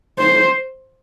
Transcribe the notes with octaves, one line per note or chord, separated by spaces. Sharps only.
C5